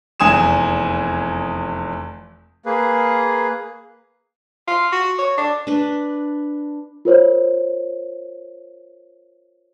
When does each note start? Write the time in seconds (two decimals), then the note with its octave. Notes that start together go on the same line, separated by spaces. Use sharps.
0.20 F1 E2 G#5 D#6 E7
2.66 A#3 G#4 B4
4.68 F4
4.92 F#4
5.18 C#5
5.37 D4
5.67 D4 B4
7.05 F4 A#4 C5 C#5